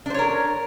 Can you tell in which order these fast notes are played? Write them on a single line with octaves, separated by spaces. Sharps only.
D4 C5 C#5 A#4